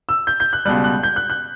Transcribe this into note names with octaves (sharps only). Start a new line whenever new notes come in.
E6
G6
G6
F#6
C#2 B2 G3 F#6
F#6
G6
F#6
F#6